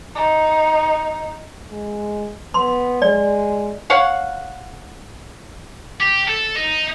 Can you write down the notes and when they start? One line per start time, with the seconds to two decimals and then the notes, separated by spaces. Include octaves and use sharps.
0.15 D#4
1.70 G#3
2.54 B3 C6
3.02 G#3 D5
3.90 C#5 F5 F#5
6.00 G4
6.28 A4
6.56 D#4